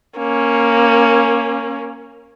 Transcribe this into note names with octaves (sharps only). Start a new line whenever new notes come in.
A#3 C#4